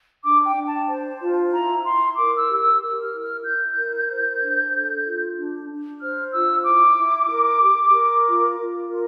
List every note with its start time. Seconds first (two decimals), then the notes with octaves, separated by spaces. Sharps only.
0.23 D4 D6
0.45 G5
0.56 D4
0.67 A5
0.88 C5 A5
1.20 F4
1.52 E4 A#5
1.84 E4 C6
2.16 A#4 D6
2.38 E6
2.49 G4
2.59 E6
2.80 A#4
3.02 F6
3.13 E4
3.23 F6
3.45 E4 G6
3.76 A#4
4.09 C5
4.41 D4
4.73 A4
5.05 F4
5.37 D4
5.69 D4
6.01 C5 F6
6.33 F4 E6
6.65 E4 D6
6.97 E4
7.30 A#4
7.62 G4
7.94 A#4
8.26 F4
8.58 F4
8.90 A#4